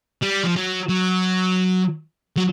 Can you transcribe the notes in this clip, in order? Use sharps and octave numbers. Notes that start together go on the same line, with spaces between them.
G3
F3
F#3
F#3
F#3